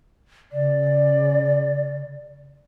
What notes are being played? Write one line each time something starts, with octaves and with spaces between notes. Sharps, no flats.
C#3 D5